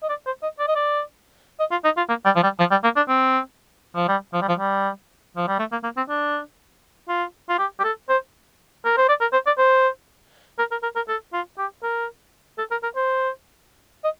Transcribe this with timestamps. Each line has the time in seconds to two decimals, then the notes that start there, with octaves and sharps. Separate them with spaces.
0.03 D#5
0.09 D5
0.26 C5
0.43 D#5
0.59 D5
0.68 D#5
0.76 D5
1.60 D#5
1.71 F4
1.85 D#4
1.97 F4
2.09 A#3
2.25 G3
2.36 F3
2.43 G3
2.59 F3
2.71 G3
2.84 A#3
2.96 D4
3.09 C4
3.96 F3
4.09 G3
4.34 F3
4.42 G3
4.49 F3
4.59 G3
5.37 F3
5.48 G3
5.59 A3
5.72 A#3
5.84 A#3
5.97 C4
6.09 D4
7.09 F4
7.49 F4
7.59 G4
7.80 G4
7.84 A4
8.09 C5
8.85 A#4
8.98 C5
9.09 D5
9.21 A#4
9.33 C5
9.47 D5
9.58 C5
10.59 A#4
10.72 A#4
10.83 A#4
10.96 A#4
11.09 A4
11.33 F4
11.58 G4
11.83 A#4
12.58 A4
12.71 A#4
12.83 A#4
12.96 C5
14.04 D#5